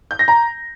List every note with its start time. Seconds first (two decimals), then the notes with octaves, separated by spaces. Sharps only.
0.11 G6
0.19 A#6
0.28 A#5